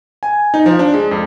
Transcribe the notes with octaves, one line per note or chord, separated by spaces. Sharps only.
G#5
D#4
F3
D4
G#3
F2